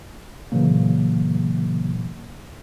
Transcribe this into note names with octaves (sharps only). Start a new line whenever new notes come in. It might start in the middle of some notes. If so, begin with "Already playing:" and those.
A#2 C#3 E3 F#3 A#3